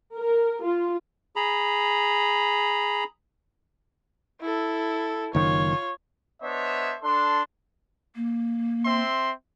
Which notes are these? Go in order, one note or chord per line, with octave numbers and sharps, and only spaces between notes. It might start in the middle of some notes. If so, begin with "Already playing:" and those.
A#4
F4
G#4 A#5 B5
E4 A4
F#1 D#3 F4 C#5
B3 D4 C5 C#5 D#5 E5
D4 A4 C6
A#3
C4 E5 C6